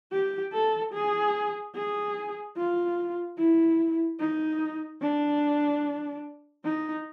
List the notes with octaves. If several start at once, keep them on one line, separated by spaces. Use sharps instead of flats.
G4
A4
G#4
G#4
F4
E4
D#4
D4
D#4